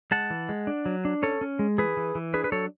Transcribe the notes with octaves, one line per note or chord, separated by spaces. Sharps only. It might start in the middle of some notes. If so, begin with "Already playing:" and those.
G#3 F#5 A5
E3
G#3
D4
F#3
D4
C#4 A4 C#5
C#4
G#3
E3 G#4 B4
E3
E3
D4 G#4 B4
B4
F#3 A4 C#5